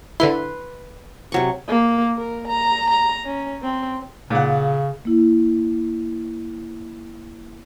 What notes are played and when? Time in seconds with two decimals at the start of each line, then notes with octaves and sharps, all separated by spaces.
0.20 D3 E4 B4 C6
1.32 C3 F#3 C#6
1.68 A#3
2.18 A#4
2.48 A#5
2.90 A#5
3.26 C#4
3.63 C4
4.30 A#2 C#3 F#5
5.05 A#3 E4